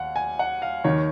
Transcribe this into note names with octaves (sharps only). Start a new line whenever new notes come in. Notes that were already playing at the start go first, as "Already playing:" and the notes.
Already playing: D#2 F5 F#5
G#5
F#5
F5
D#2 D#3 C#5